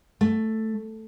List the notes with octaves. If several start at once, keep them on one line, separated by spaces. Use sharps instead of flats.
A3